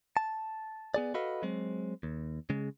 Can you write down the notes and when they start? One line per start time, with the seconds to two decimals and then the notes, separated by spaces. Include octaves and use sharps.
0.17 A5
0.94 B3 G#4 D5
1.14 F#4 A4 B4 D#5 F5
1.43 F#3 G#3 C4
2.03 D#2
2.50 C#3 G#3